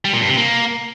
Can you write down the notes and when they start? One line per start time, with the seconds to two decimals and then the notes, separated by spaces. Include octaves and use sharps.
0.05 G3
0.13 A#2
0.21 G2
0.29 C3
0.37 A#3